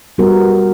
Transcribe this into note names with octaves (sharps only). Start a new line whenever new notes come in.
G3 B3 F#4 A#4